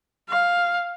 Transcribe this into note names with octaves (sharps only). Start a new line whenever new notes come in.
F5